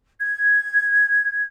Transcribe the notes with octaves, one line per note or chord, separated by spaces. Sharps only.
G#6